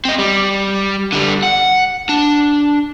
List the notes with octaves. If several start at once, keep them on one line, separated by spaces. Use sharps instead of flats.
C4 D#5
G3
D3 G3
F#5
D4